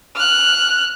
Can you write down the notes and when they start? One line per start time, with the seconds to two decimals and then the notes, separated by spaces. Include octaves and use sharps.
0.16 F6 F#6